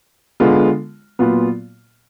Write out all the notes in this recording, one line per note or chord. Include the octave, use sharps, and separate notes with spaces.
D3 G#3 B3 F4
A#2 F#3 B3 F4